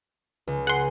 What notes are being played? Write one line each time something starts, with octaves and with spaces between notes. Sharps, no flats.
C#2
G#4 F#5 C6